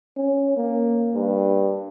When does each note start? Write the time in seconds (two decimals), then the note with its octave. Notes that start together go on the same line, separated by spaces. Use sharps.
0.16 C#4
0.57 A#3
1.14 G2